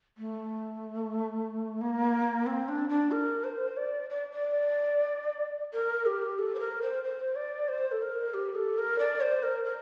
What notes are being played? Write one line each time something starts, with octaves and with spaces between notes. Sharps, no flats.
A3
A#3
C4
D4
D4
A#4
C5
D5
D5
D5
A#4
G4
A4
C5
A#4
C5
C5
D5
C5
A4
A#4
G4
A4
A#4
D5
C5
A#4
A#4